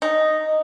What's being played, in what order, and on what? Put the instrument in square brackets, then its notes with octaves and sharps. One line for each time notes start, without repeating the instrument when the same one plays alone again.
[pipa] D#4